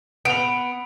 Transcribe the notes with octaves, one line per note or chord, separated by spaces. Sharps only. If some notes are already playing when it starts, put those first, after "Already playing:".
B3 D7 F7